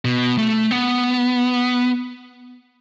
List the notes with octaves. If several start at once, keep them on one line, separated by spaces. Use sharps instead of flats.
B2
A3
B3